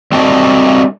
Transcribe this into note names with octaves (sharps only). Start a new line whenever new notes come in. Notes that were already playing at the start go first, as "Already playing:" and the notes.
G3 C4 D4 F#4 A4 D#5